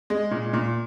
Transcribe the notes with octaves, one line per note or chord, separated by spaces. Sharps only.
G#3
A#2
A#2